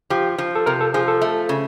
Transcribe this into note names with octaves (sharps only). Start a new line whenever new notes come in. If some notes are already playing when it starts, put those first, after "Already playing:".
F3 G4
F3
A4
C3 A#4
A4
F3 G#4
A4
A3
C#3